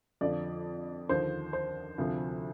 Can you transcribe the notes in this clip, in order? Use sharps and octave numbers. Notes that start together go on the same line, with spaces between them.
F2 D3 F3 D5
D#2 D3 F3 C5
C5
D2 C3 F3